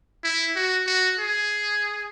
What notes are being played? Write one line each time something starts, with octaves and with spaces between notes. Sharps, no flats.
E4
F#4
F#4
G#4